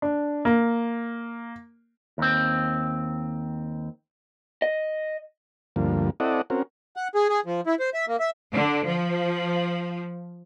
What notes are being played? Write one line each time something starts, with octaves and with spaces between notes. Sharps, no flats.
D4
A#3
D#2 C4
D#5
D2 G2 F3 A#3
C4 E4 A4 D5 D#5 F#5
C4 C#4 F#4 A#4
F#5
G#4
G#4
F3
E4
C5
E5
A#3
E5
D3
F3